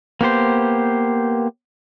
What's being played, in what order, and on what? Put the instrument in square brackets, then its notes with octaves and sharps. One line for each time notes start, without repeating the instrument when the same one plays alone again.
[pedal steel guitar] A#3 B3 G4 C5